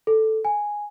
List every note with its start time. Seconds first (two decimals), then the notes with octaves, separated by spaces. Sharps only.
0.07 A4
0.45 G#5